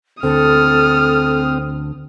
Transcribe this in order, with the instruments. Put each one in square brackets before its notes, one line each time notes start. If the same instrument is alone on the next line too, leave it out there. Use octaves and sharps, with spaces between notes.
[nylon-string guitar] D2 D3 [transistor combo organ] C4 [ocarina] A4 [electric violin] D#6 F6